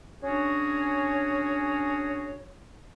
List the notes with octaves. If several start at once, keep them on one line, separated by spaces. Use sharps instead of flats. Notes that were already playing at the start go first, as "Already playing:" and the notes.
C#4 D4 F#4 G#4 C#5